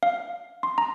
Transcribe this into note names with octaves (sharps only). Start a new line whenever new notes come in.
F5
C6
A#5